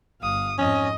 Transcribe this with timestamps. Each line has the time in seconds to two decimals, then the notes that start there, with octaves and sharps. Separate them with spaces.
0.22 G1 F5 D#6
0.58 F2 G#2 C#4 D#5